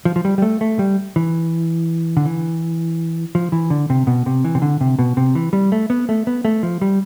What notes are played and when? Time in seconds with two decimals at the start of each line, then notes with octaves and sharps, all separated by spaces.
0.05 F3
0.16 F3
0.25 G3
0.38 G3
0.42 A3
0.61 A3
0.79 G3
1.16 E3
2.17 D3
2.26 E3
3.35 F3
3.52 E3
3.70 D3
3.90 C3
4.07 B2
4.26 C3
4.44 E3
4.55 C3
4.62 D3
4.81 C3
4.99 B2
5.17 C3
5.35 E3
5.53 G3
5.72 A3
5.90 B3
6.09 A3
6.27 B3
6.45 A3
6.63 F3
6.81 G3